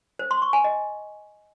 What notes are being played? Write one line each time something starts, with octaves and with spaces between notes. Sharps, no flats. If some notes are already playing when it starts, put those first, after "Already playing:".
C5
C6
C#6
G#5
D#5